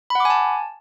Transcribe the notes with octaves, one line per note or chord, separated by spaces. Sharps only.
F#5 G#5 A5 B5 D6